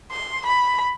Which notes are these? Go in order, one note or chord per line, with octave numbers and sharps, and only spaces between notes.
C6
B5